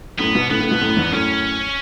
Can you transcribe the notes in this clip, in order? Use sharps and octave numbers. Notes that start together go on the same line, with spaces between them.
F#2 A2 B3
G#2 B2
A2 C#3 B3
A2 C#3
G#2 B2
F#2 A2
E2 G#2
F#2 A2 C#4